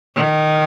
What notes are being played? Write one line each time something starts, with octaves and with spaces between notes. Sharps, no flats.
D#3